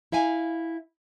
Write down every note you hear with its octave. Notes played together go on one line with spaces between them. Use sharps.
E4 E5 F5 G#5